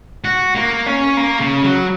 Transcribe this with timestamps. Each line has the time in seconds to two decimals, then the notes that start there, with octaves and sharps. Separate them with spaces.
0.25 F#4
0.55 A#3
0.86 C#4
1.17 A#3
1.40 C#3
1.63 F#3